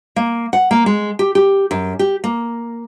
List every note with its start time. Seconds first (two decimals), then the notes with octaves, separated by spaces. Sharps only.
0.16 A#3
0.53 F#5
0.71 A#3
0.86 G#3
1.19 G4
1.35 G4
1.71 F#2
1.99 G4
2.24 A#3